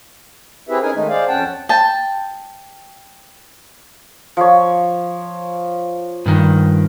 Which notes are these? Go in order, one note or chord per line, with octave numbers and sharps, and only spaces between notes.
C4 E4 G4 G#4 B4 E5
C#4 D#4 G#4 A#4 G#5
D#3 G#3 A3 D#4
G#4 C5 D5 F5
F2 C#4 F#5 G5 A5
G5 A5
F3 C#5
G2 D#3